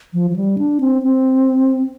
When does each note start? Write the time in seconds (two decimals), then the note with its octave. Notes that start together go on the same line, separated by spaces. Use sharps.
0.13 F3
0.30 F3
0.36 G3
0.58 D4
0.80 C4
1.02 C4